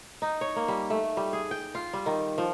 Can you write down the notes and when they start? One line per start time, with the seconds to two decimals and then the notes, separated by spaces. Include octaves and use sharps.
0.22 D#4
0.41 C#5
0.56 A#3
0.68 G3
0.90 A3
1.17 G3
1.33 G#4
1.51 G5
1.75 F4
1.93 G3
2.06 D#3
2.38 F3